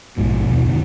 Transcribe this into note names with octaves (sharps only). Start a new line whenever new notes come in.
A#1 G#2 B2
D#2 B2 B3
F2 D3